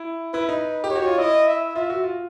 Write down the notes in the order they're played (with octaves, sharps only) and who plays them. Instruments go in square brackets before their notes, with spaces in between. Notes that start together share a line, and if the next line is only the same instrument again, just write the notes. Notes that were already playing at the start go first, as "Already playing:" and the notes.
Already playing: [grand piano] E4
[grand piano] E4 [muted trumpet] B4
[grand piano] D#4
G4
[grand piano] F#4 [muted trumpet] C#5
[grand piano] F4
[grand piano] E4 [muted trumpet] D#5
[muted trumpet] E5
[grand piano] F4 [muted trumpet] E5
[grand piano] F#4
F4